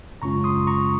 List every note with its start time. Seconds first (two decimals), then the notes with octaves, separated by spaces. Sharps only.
0.22 F#2 C#3 G#3 C#4 F4 A#5 C#6
0.44 C6 D#6
0.67 A#5 C#6